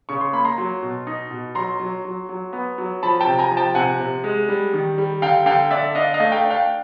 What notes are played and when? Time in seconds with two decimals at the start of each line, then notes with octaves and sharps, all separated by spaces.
0.09 C#3 C#6
0.21 C6
0.33 A#3 B5
0.45 A#5 C6
0.58 F#3
0.82 B2
1.07 D#4
1.31 B2
1.55 F#3 A#5 C6
1.80 F#3
2.05 F#3
2.29 F#3
2.53 B3
2.78 F#3
3.03 F3 A5 B5
3.20 G5 A5
3.26 C3
3.39 G#5 A#5
3.51 F3
3.57 G5 A5
3.75 C3 F#5 G#5
4.00 C3
4.24 G#3
4.49 G3
4.74 D#3
4.98 G3
5.22 D3 F5 G5
5.46 D3 F5 G5
5.71 D3 D5 E5
5.95 D4 D#5 F5
6.14 D#5 F5
6.20 A3
6.32 F5 G5
6.45 D4
6.50 F5 G5